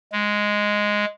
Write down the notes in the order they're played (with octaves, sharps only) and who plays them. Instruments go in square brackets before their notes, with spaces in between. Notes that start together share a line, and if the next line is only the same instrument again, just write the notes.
[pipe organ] G#3